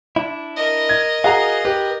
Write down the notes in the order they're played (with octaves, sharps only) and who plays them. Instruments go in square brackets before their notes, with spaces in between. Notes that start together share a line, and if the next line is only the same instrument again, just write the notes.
[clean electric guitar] D4 E4
[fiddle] A#4 D#5
[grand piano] G#6
[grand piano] F#4 G#4 A#5 [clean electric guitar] F5
[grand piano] G4 [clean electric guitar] B4